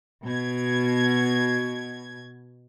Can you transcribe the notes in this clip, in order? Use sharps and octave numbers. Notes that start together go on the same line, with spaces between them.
B2 G#6